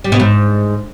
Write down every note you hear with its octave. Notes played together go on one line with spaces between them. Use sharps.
G3
B2
G#2